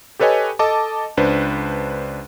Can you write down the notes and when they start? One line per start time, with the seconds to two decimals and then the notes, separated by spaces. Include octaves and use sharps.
0.20 G4 A4 B4 C#5 D#5 G#5
0.59 A4 D#5 A5 D6
1.17 C#2 D4 B4 C5